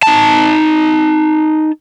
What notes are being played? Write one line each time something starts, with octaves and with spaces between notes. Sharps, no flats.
D#4 A5